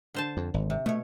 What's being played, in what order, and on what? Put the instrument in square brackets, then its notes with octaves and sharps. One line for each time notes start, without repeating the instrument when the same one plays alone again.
[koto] D3 C5 A5
[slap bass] F2
G#1
[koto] C3
[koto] B2 C#5 [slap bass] A3